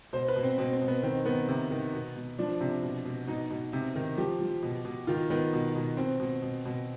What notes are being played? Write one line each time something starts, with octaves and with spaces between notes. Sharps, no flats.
B2 C5
B4
B2
C4
B2 C4
C4
B2
B3
D#3 C4
D#3 B3
C3
D#3
B2
B2
F3 D4
C3
B2
B2
B2 D#4
B2
C3
D#3
F3 G4
F3
B2
B2
D#3 F4
D#3 B3
B2
B2
B2 C4
B2
B2
B2